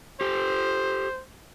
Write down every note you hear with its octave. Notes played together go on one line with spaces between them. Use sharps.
G4 A4 C5